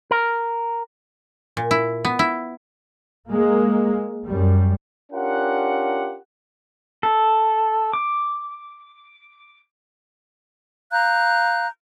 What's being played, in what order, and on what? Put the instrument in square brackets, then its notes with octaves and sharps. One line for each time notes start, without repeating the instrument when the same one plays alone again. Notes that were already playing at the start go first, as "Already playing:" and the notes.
[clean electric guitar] A#4
[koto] A#2
E4
B3
E4
[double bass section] G#3 A#3
F#2 G3
[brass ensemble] C#4 D4 F4 G4 A#4 F#5
[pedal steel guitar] A4
D6
[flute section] F5 A#5 F#6 G6